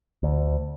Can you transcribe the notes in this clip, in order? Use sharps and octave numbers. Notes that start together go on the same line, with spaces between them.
D2